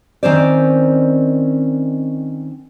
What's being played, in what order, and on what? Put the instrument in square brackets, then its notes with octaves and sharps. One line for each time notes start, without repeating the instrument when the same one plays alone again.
[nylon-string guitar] D#3 C4 C#4 C5 D5